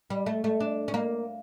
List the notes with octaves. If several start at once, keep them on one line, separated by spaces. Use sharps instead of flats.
G3
A3
A3
D4
C#4
A#3